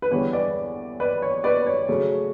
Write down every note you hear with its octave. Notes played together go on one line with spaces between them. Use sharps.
B4
E2 D3 G3 C#5
B4 D5
B4 D5
C#5
B4 D5
C#5
C#3 F#3 A3 C#4